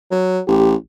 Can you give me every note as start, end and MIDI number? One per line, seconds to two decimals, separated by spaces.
0.11 0.40 54
0.48 0.75 33
0.48 0.73 67